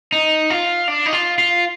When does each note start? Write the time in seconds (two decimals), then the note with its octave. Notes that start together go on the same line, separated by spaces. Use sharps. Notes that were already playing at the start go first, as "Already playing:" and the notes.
0.12 D#4
0.50 F4
0.88 D4
1.06 D#4
1.13 F4
1.38 F4